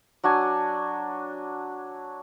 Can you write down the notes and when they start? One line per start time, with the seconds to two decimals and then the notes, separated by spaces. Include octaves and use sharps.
0.23 F#3 D4 F#4 G#5